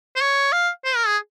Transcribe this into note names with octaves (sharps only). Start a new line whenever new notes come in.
C5
C#5
F5
C5
A#4
G#4